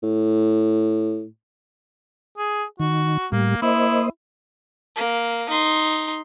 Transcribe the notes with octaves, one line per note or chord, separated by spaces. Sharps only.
A2
G#4
D#3 F#4
A2 G3 A#3
A#3 E4 C5 D#5
A#3
D#4 C6